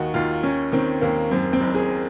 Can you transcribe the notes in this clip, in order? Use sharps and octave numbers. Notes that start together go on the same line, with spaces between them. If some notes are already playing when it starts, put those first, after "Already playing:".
Already playing: D#2 D#3 D#4 F#4
D#2 F4
D#3 C#4
D#3 C4
D#2 A#3
F#2 C4
C4
F#1
G#4